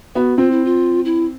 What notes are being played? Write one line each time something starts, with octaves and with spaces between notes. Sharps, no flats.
B3 F#4
C4 F4
E4
F4
E4